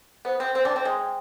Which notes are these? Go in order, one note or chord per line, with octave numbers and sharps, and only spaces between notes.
B3 C5
C4 C5
C4 C5
D4
C5
C4
G#3 G5
G5